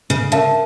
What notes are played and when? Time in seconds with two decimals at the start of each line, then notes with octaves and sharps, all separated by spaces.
0.10 C#3
0.32 C#3 A#4 E5 A5